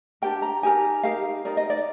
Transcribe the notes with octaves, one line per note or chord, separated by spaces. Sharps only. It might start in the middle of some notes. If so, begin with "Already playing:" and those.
D4 G4 A#4 G5
A#5
D#4 G4 A#4 G#5
D#4 G4 A#4 F5
D#4 A#4 D5
D#5
D5